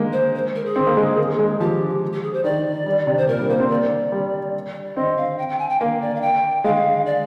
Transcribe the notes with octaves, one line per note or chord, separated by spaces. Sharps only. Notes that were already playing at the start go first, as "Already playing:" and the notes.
Already playing: G#3 A#3
C5
C5
A#4
G#4
C4
A#3
G#3
A#3
G#3
F3 G4
G4
G#4
C5
D#3 D5
G3
C3
C5
A#2 A#4
G3
A#3 C5
C4
A#3 D5
G3
D5
C4 D#5
F5
G5
G5
G#5
G5
A#3 F5
D5
F5
G5
G#3 F5
D5